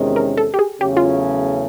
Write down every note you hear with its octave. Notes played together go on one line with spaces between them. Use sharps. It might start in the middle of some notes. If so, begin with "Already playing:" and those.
Already playing: E2 C3 D#3 G#3 C#4
A#4
A4
G4
G#4
E2 C#3 F#3 A3 C#4 G4
F4